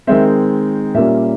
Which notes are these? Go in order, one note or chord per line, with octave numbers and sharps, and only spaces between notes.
D#3 G#3 C4 E5
A#2 G3 A#3 C#4 E5